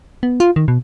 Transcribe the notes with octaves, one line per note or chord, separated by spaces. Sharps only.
B3
F4
D#3
B2